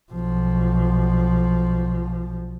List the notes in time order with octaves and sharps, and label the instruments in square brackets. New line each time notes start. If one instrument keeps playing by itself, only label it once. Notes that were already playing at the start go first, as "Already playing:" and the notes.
[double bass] B1 F3